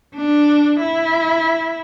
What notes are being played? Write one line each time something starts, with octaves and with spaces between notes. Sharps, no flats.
D4
E4